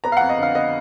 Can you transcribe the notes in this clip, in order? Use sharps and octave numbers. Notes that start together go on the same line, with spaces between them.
B3 A#5
F5
F2 F#5
D#5
D3 F5
B3 D#5